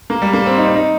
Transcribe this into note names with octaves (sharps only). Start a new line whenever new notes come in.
A#3
G3
A#3
C4
D#4
C4
D#4